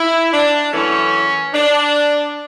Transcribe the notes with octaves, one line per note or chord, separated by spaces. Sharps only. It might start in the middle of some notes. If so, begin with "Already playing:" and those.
Already playing: E4
D4
F#2 E3 A3 C#4
D4